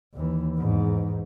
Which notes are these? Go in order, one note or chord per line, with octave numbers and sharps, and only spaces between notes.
D#2 E3
E2 G#2